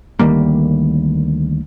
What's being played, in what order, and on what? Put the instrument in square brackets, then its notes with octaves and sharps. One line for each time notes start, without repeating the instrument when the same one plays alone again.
[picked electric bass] D2 D#3 G3 A#3